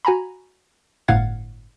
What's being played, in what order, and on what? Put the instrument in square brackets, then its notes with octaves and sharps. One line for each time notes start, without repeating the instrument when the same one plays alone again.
[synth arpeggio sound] F#4 G#5 A#5 B5
G1 A2 F5 F#5 G#6 A6